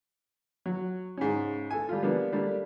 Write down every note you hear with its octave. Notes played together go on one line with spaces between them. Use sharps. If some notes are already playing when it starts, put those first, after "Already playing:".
F#3
G#2 C#3 C#4
A4 G#5
G3 A3 F4
F3 G3 A#3 B3 D4
G3 A3 A#3 D4